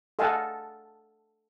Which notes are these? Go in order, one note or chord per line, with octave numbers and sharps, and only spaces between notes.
A4 D#5 F5 F#5 G#5 A5